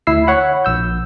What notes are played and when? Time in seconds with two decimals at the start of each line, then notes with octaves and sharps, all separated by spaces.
0.07 D2 E4 E6 C7
0.27 C#5 F#5 B5
0.65 A#1 E6 G6